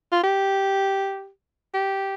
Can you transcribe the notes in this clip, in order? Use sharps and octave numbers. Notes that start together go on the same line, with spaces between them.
F4
G4
G4